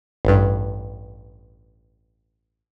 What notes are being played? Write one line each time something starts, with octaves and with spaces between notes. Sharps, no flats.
A1 G2